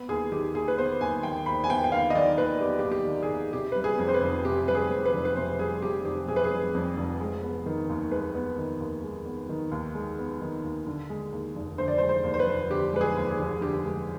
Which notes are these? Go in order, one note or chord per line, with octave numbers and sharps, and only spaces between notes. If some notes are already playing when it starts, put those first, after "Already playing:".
Already playing: B3
D#2 G#4
D#3 G4
D#2 G#4
B4
B3 C5
D#2 G#5
D#3 G5
D#2 B5
G#5
B3 G5
G5
D#2 F5
D#5
D#3 D5
D#2 B4
B3 G4
G4
D#2
G4
D#3
G#4
D#2
C3 G4
G3 B4
G#4
F2
C5
B4
F1
C3 G4
G3 B4
G#4
F2
B4
F1
B4
C3 C5
G3 G#4
F2 G4
F1 G4
C3 G#4
B4
G#4
G3
F2
F1
G#3
B3
D#3
D#2
G#3 B4
B3
D#3
D#2
G#3
B3
D#3
D#2
G#3
B3
D#3
D#2
D3
G#3
D#2
F1
D3 C5
D5
C5
G#3
C5
D#2
C5
B4
F1
D3 G4
G#3 B4
G#4
D#2
G#4
F1
D3 G4
G#3